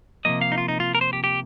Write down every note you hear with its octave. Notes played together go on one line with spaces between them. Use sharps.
C3 F3 A#3 D#5
F5
D#4
F4
D#4
F4
A#4
C5
G4
G4